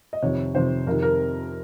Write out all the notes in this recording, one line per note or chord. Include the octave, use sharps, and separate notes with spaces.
D#5
F2 C3 D#3 C#5
F2 C3 D#3 C5
F2 C3 D#3 A#4
A#4